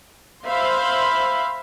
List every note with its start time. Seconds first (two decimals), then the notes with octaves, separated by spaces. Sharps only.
0.46 C5 E5 F5 B5 C6